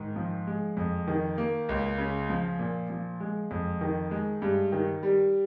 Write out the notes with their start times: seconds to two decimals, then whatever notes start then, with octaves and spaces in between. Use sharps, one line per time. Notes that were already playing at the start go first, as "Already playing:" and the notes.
Already playing: G#2 D#3
0.16 F3
0.47 G#3
0.77 F2
1.07 D#3
1.38 A#3
1.69 C#2
1.98 C#3
2.30 F3
2.59 A#2
2.90 F3
3.20 G#3
3.51 F2
3.81 D#3
4.11 G#3
4.42 G2
4.72 D#3
5.03 G3